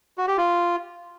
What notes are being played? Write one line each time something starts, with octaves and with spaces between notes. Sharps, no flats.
F#4
G4
F4